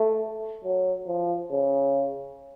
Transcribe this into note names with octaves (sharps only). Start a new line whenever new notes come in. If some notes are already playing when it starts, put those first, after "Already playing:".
Already playing: A3
F#3
F3
C#3